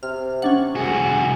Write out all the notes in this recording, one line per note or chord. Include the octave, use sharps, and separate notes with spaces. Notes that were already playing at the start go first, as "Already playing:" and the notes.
C3 F6
C#4 D4 F#5
C2 F#4 G#4